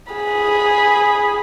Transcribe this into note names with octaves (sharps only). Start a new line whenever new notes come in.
G#4 B5